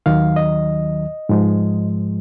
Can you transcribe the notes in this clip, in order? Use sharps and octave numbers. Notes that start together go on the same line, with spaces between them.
D#2 D#3 F#3 F5
D#5
G#2 F3 G#3